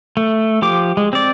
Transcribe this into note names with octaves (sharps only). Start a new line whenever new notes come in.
A3
F3 G4 D6
G#3
C4 D5